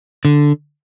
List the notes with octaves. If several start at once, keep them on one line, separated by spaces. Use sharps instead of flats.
D3